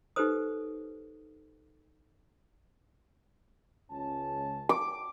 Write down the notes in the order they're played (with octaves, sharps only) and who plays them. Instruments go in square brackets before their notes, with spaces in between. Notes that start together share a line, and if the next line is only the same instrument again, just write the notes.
[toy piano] D#4 G4 A4 B4 C5 D#6
[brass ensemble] C#2 C#4 A5
[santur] D6